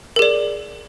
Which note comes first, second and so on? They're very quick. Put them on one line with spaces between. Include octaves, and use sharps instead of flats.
A#4 G#4 D5